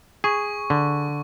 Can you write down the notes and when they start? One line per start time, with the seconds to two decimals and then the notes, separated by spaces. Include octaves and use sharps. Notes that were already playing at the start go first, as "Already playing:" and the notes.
0.24 G#4 C#6
0.70 D3